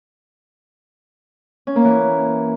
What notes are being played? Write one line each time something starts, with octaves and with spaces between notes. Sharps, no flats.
C#4
A#3
E3